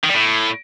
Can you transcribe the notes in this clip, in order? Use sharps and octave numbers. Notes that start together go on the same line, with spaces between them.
D#3
G3
A2